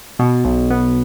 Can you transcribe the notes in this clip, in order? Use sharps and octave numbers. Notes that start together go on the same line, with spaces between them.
B2
B1
B3